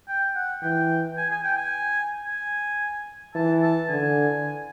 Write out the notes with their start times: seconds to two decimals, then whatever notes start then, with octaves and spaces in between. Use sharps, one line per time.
0.08 G5
0.35 F#5
0.63 E3 G5
1.17 G#5
1.30 G#5
1.44 G5
1.58 G#5
2.26 G#5
3.35 E3 A5
3.62 A5
3.89 D3 G#5